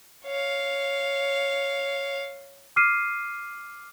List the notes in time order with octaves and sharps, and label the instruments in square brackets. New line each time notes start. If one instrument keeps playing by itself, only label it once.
[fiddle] C#5 F5
[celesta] D6 F6 C7 D#7